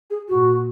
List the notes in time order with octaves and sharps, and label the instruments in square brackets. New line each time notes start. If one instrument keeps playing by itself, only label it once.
[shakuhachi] G#4
[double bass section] A#2 [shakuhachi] F#4